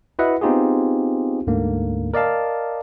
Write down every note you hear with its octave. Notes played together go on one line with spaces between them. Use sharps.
E4 F#4 B4 D#5 E5 F#5
B3 C4 D#4 F4 G4 G#4
D2 G#2 D3 A#3
A#4 D5 D#5 F5 A5